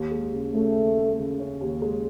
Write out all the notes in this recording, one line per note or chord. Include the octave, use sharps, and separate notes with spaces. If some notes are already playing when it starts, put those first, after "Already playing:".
Already playing: D#2
G#3
C#3
A3 C#4
D#2
G#3
C#3
C#4
D#2
G#3